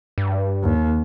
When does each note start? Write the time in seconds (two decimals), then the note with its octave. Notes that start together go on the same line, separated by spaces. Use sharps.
0.18 G2
0.63 D#2